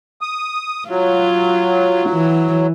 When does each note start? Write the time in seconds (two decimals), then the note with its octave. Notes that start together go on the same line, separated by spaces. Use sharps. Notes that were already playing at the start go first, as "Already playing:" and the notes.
0.21 D#6
0.89 F#3 F4
2.09 E3